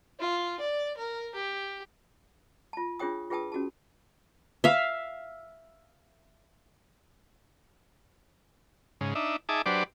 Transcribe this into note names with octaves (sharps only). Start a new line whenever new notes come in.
F4
D5
A#4
G4
F4 A5
D4 F4 G#4 C#5 G5 D#6
F4 G#4 B4 G5 A5 D#6
C#4 F#4 G#4 A5
E5 F5
G#2 C#3
D4 D#4 E5
D#4 G#4 E5 A5 D6
F#3 D4 G4 B4 C5 D5